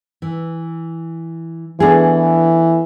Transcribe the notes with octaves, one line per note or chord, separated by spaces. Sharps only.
E3
E3 A3 B3 D4 E4 G#4